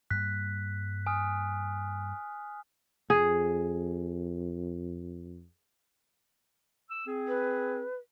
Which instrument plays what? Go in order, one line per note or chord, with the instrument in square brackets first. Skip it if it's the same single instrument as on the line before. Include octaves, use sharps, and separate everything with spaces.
[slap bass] G2 G3 A#3 [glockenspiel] F#6 B6
[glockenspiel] G#5 D#6 F6
[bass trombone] F2 [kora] G#4
[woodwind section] E6
C4 G#4
[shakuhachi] B4